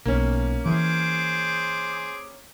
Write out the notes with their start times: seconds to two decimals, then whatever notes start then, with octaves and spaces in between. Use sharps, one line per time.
0.05 B1 A#3 C#4
0.66 E3 G#4 C5 D6